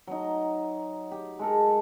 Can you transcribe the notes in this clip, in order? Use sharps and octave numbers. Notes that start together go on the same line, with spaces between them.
F#3 D#4
G4
G#3 A4 A#4